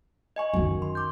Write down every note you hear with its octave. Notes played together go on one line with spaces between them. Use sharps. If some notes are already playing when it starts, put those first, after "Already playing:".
D#5 G#5 C#6
F#2 D#3
C6
D6 G6